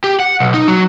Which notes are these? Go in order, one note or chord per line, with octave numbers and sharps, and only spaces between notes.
G4
F#5
B1
D#4
F#3